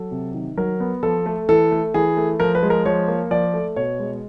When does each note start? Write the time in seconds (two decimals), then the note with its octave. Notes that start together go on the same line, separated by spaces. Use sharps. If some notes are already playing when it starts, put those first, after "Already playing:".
Already playing: F#3 A4
0.11 C3
0.35 D#3
0.57 F#3 A#4
0.80 B3
1.03 F3 A4
1.26 A3
1.49 E3 A4
1.71 A3
1.94 E3 G#4
2.17 A3
2.40 F3 A#4
2.55 B4
2.63 G#3
2.70 A#4
2.86 F3 C#5
3.08 A#3
3.31 F3 D5
3.54 A3
3.76 B2 C#5
3.99 G#3